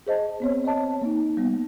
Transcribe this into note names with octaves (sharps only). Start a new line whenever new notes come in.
G#4 C5 D#5 A5
B3 C4 C#5
C#5 D#5 A5
A#3 D#4
G3 B3